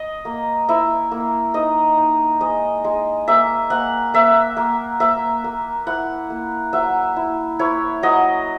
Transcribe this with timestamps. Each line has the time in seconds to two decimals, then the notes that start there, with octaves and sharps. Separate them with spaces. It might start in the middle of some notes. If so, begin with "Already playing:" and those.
Already playing: D#5
0.25 A#3
0.69 E4 E5
1.11 A#3
1.54 D#4 D#5
1.98 D#4
2.41 G#3 D#5
2.84 G#3
3.28 A#3 E5
3.70 A#3 F#5
4.14 A#3 E5
4.57 A#3
5.00 A#3 E5
5.44 A#3
5.87 E4 F#5
6.30 A#3
6.73 F#3 E5
7.16 E4
7.59 E4 C#5
8.03 F#3 D#5